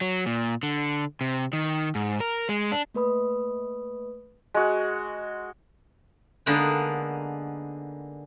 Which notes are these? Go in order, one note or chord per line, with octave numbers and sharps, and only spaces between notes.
F#3
A#2
D3
C3
D#3
G#2
A#4
G#3
D4
A3 A#3 B4 B5 D#6
G#3 F#4
D3 G#3 A#3 B3 D#4